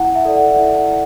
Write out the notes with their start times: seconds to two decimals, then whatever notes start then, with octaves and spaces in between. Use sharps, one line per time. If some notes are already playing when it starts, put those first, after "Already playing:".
Already playing: E4 F#5
0.15 E5
0.25 A4 D5
0.36 F#5
0.58 E4 E5